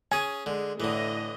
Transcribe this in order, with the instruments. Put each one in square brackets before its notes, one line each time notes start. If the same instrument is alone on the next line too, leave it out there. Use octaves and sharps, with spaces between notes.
[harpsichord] C#4 G#4 [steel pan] G#5
[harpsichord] D3 [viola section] G#3
[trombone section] A2 [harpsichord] D3 E3 [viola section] D#5